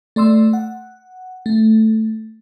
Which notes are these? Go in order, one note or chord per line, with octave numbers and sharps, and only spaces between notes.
A3 D5 C6 E6
F#5
A3